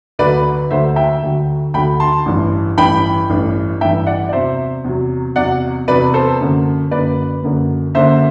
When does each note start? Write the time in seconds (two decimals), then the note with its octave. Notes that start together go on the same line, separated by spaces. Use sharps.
0.19 D2 D3 F#3 B4 D5
0.71 D2 D3 F#3 C5 E5
0.96 E5 G5
1.22 D2 D3 F#3
1.74 D2 D3 F#3 G5 B5
2.00 A5 C6
2.26 A1 G2 E3
2.78 A1 G2 E3 G5 B5
3.29 A1 G2 E3
3.81 A1 G2 E3 E5 G5
4.06 D5 F#5
4.29 D5
4.32 E2 C3 F#3 C5 E5
4.84 E2 C3 F#3
5.36 E2 C3 F#3 D5 F#5
5.88 E2 C3 F#3 B4 D5
6.14 A4 C5
6.39 F#1 F#2 D3
6.91 F#1 F#2 D3 B4 D5
7.43 F#1 F#2 D3
7.95 F#1 F#2 D3 C5 E5